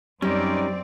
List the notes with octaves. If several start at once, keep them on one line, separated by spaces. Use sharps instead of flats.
F#2 G3 C4 C#4 D#4 D5